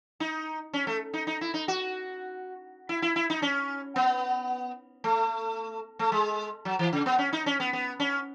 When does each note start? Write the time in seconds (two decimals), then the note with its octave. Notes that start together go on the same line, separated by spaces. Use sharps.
0.20 D#4
0.73 C#4
0.87 A3
1.13 D#4
1.27 D#4
1.41 E4
1.54 D#4
1.68 F#4
2.89 E4
3.02 E4
3.16 E4
3.30 D#4
3.42 C#4
3.96 B3
5.04 A3
5.99 A3
6.12 G#3
6.65 F#3
6.79 E3
6.93 C#3
7.06 B3
7.18 C#4
7.33 D#4
7.46 C#4
7.60 B3
7.73 B3
8.00 C#4